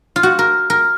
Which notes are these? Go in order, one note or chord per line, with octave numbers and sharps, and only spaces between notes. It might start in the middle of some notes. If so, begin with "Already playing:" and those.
F4
F#4
A#4
A#4